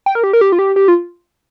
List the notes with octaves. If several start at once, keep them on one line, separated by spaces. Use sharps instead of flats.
G5
A#4
G4
A#4
G4
F4
G4
G4
F4